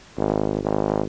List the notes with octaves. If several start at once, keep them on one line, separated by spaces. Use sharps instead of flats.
G#1
G#1